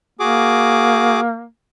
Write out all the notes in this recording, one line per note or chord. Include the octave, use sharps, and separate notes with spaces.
A#3 F#4 G#4 D6